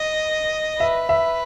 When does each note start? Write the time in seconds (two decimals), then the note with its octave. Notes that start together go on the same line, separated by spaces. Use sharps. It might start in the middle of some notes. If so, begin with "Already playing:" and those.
Already playing: D#5
0.80 B4 E5
1.09 E5